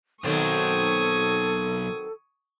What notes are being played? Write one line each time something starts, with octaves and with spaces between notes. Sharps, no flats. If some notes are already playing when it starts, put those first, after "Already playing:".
B1 D#3 F#3 C4 A4 C#6 D#6 G#6